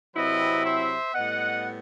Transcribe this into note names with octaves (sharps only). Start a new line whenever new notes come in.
C3 F#3 C4 E4 B4 D#5
C5 E5
A2 G3 B3 D#5 F#5